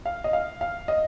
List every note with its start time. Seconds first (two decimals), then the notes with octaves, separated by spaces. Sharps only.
0.06 F5
0.24 D#5
0.33 F5
0.61 F5
0.88 D#5